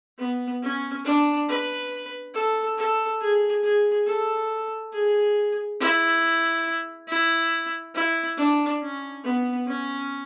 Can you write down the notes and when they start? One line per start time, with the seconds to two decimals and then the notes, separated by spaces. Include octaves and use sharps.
0.18 B3
0.63 C#4
1.05 D4
1.48 B4
2.34 A4
2.78 A4
3.21 G#4
3.64 G#4
4.07 A4
4.93 G#4
5.80 E4
7.08 E4
7.95 E4
8.37 D4
8.81 C#4
9.24 B3
9.67 C#4